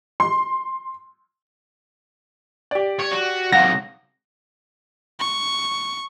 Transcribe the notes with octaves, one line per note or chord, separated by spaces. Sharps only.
C6
G4 D5
C#5
F#4
C3 F#3 F5 F#5 A#6
C#6